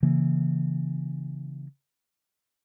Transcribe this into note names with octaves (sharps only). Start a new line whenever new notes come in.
C#3 E3 A#3